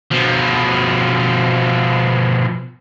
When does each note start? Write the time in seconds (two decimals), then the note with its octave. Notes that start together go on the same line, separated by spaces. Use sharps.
0.11 B2 F3